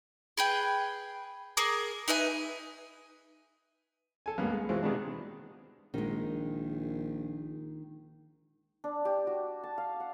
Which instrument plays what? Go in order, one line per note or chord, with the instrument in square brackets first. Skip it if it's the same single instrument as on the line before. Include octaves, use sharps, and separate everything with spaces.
[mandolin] G#4 B4 G5
G#4 A#4 D6
D#4 B4 E5 G#5
[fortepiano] A4 G#5
C#2 G2 A#3 B3
G#3
B2 E3 G#3 C4 F4
C3 D#3 G#3 B3 D4
[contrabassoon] A#1 [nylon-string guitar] D#3 G#3
[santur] D4
G4
F#4
A5
F5
F#5